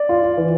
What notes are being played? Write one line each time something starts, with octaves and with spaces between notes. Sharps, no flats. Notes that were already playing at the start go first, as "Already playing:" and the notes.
Already playing: D5
F4
F4
E3